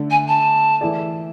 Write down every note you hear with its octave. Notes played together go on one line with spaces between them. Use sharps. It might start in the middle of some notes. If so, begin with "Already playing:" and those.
Already playing: D3 A3 D4 A4
G#5
A5
E3 A3 E4 G#4 D5